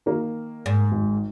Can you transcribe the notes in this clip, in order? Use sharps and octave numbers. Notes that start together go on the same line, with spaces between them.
D#3 A#3
G#2
G#1